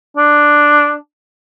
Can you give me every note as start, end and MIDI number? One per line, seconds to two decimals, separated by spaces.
0.17 0.95 62